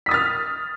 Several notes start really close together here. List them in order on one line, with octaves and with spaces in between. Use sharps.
B6 D#6 A6 F6